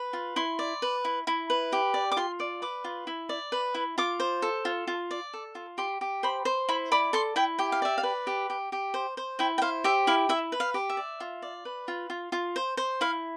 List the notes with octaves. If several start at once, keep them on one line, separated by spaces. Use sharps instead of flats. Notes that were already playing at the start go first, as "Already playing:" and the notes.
Already playing: B4
F4
E4 C6
D5
B4
E4
E4
B4
G4
D5
D6
F4 C6
D5
B4 D6
F4
E4
D5
B4
E4
F4 D6
C5
A4
F4
F4
D5
A4
F4
G4 C6
G4
C5 B5
C5
E4 B5
D5 B5
A4 C6
E4 G5
G4 G5
F5
D5 E5
F5
B4
G4
G4
G4
C5
C5
E4 G5
G5
C5 F5
G4 E5
E4 F5
E4 E5
B4
F5
G4
E5
D5
F4
D5
B4
F4
F4
F4
C5
C5
E4 F5